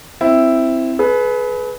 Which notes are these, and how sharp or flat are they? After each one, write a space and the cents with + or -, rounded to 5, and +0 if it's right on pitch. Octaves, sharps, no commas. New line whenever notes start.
C4 +0 E4 +0
G#4 +40 B4 +0